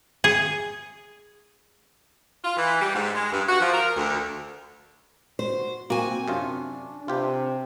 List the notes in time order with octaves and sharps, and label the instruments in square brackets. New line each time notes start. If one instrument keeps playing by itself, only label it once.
[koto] G#4
[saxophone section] F4
E3
G3
G#2
G#3
G2
F#4
F3
A#4
D2
[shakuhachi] F#4 [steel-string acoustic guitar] C5
[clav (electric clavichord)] A#3 [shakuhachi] C4 [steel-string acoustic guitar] F#4 G#5
[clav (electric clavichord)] F#2 C3 F4 [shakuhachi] D4
[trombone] C3 [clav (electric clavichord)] F4 G4 B4